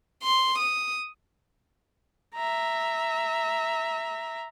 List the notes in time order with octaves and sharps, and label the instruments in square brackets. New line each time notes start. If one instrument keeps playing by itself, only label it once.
[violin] C6
D#6
[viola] E5 A#5